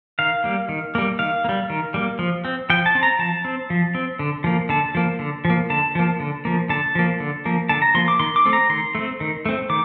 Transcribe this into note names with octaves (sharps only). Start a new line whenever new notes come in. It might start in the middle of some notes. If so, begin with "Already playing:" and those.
D#3 F5
G3 A#3
D#3
G3 A#3
D#3 F5
A#3
G3
D#3
G3 A#3
F3
C4
F3 G5
A5
C4
A#5
F3 A5
C4
F3
C4
D3
F3 A#3
D3 A5
F3 A#3
D3
F3
A#3
D3 A5
F3 A#3
D3
F3 A#3
D3 A5
F3 A#3
D3
F3 A#3
D3 A5
A#5
F3 A#3 C6
D6
D#3 C6
D6
A3 C4
A#5
D#3 C6
A3 C4
D#3
A3 C4
D#3 D6